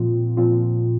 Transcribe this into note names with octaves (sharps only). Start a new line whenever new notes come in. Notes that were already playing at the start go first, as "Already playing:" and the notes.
Already playing: A#2 F3 C4 F4
A#2 F3 C4 F4